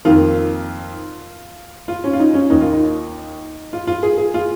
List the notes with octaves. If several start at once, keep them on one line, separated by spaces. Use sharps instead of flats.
F2 D#3 A#3 F4
F4
C#4
F4
D#4
C#4
D#2 D#3 A#3 D#4
F4
D#4
F4
F4
G#4
G#4
F4